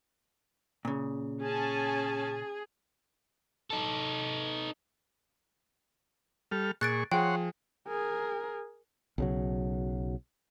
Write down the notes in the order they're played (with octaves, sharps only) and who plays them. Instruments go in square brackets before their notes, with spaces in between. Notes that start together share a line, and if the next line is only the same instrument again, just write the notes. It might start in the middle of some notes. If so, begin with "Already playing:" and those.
[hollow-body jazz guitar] A#2 C#3
[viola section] C#4 G#5 A5 [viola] G#4
[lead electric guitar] D#4 A4
[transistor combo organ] G3 A4 F6
[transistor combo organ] A#2 G#4 C#6 [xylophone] F#6 A6 D7
[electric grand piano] F3 G#4 [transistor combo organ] C#5 F#5 C6 [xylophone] G5
[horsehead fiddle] G#4 A#4
[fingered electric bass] B1 C#3 F#3